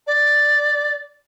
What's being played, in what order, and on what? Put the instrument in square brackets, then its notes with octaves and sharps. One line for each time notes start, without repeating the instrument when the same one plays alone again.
[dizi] D5